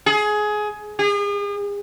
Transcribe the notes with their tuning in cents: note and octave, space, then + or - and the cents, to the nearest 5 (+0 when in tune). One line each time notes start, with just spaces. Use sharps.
G#4 +20
G#4 -40